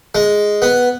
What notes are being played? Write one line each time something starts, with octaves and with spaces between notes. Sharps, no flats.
G#3
B3